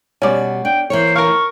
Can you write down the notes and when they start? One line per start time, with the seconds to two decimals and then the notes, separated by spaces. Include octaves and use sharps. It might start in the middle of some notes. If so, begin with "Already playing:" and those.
0.22 B2 G3 C#4 D5
0.65 D4 G5
0.90 E3 A#3 C5 C#5
1.16 A#4 F5 C#6